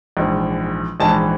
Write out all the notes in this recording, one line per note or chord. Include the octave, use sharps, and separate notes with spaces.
A#1 G#2 E3
A#1 G#2 E3 A5